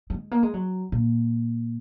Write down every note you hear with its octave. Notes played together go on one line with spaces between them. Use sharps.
F#3
G#3
A#3
G#3
F#3
A#2